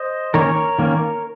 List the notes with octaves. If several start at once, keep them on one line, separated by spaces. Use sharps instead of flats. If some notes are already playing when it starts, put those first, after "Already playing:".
Already playing: C5 D#5
D#3 A#3 C#4 A#4 C#5
D#3 A#3 C#4